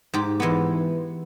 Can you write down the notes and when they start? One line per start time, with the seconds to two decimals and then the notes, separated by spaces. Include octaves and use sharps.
0.14 G#2 G4
0.40 E3 G#3 B3